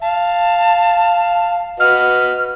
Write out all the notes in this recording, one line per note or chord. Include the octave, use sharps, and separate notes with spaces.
F5 A5
F#4 B4 D#5 F6